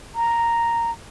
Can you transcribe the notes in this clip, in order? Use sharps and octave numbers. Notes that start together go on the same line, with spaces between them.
A#5